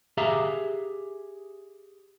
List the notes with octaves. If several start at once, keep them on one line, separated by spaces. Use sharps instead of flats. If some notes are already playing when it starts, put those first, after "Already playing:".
G4 G#4 E5 F5 A#5